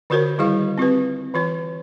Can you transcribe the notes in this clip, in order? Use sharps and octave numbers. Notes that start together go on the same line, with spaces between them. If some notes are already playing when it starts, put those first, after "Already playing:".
D3 F4 F#4 A#4 C5 C#5
D#3 G3 E4 G#4 F5 C#6
C4 F4 G4 B4
E3 F4 C#5